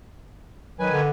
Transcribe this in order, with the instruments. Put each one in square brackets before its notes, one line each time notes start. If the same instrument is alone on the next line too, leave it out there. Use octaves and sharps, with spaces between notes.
[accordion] D#3 B4 G#5 [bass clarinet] F#3
[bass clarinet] D3